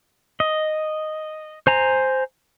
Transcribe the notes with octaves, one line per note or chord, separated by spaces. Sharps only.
D#5
C5 G#5 A#5